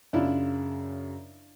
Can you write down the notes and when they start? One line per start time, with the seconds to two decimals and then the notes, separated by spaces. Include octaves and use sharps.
0.13 F#2 C#3 D4 E4 F4